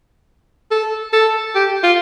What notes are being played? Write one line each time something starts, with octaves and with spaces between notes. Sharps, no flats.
A4
A4
G4
F4